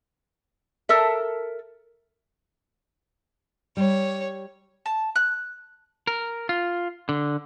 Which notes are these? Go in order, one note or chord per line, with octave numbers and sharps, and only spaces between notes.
A4 A#4 E5
G3 C#5
A5
F#6
A#4
F4
D3